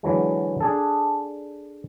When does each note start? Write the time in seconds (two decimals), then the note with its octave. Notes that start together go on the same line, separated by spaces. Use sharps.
0.03 D3 E3 F#3 G#3
0.60 D4 G#4 A4